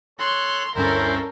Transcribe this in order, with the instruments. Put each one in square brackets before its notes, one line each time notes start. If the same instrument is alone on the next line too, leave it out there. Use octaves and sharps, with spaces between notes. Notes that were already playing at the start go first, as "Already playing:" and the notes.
[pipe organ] A4 C#5 F#6 [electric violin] C6
[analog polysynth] D2 G2 C#4 [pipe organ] C4 E4 C5 [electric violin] A4 A#4